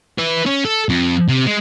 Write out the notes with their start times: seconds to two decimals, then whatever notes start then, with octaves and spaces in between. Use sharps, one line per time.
0.19 B4 E5
0.46 C#4
0.65 A4
0.89 F2
1.29 C3
1.46 G#3